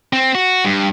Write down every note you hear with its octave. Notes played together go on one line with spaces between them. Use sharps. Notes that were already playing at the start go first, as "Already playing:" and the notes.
C4
F#4
G2